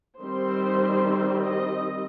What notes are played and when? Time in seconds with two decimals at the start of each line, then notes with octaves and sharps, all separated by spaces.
0.22 D#3 G3 C4 C5
1.43 D#5